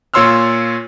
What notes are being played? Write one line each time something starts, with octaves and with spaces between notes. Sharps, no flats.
A#2 F4 C#5 C6 E6 F6